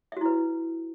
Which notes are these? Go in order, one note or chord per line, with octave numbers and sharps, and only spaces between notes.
E4 F#4 B4 E5